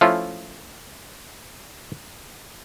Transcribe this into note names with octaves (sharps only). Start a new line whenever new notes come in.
F3 A3 C#4 E4 F4